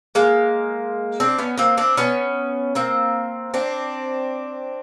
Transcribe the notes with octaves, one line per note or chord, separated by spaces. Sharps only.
G#3 A#3
C4 D4
B3 C#4
A#3 C4
C4 D4
B3 C#4
A#3 C4
C4 D4